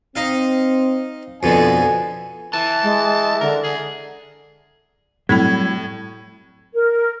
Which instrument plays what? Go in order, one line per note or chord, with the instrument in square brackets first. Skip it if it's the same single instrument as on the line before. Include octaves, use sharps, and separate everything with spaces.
[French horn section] C4 [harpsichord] D#4 F5
[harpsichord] F2 B2 D3 [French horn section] F3 [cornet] G#5
[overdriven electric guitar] E3 [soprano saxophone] A5
[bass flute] G#3
[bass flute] D3 [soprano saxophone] A#4
[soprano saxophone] G#4
[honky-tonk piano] A2 [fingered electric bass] F#3 G3 [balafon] C4 E4 B5 [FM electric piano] G#6
[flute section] A#4